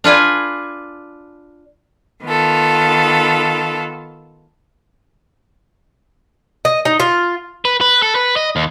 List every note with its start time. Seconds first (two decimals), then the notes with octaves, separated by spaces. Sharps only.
0.04 D4 F4 B4 G#5
2.25 D#3 B3 F4 A4
6.65 D#5
6.85 D#4
7.00 F4
7.65 B4
7.81 B4
8.02 A4
8.15 B4
8.36 D#5
8.56 D#2